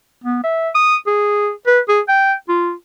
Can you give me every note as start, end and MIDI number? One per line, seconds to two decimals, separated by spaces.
0.24 0.40 59
0.43 0.69 76
0.75 0.96 87
1.07 1.50 68
1.66 1.80 71
1.88 2.01 68
2.08 2.33 79
2.49 2.72 65